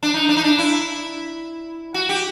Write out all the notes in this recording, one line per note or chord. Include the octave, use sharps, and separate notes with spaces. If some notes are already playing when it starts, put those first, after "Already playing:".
D4
D#4
D4
D#4
D4
E4
F#4
G4